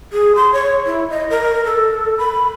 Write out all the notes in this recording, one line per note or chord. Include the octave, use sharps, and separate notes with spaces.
G#4
C6
C#5
E4
D#5
A#4
A4
B5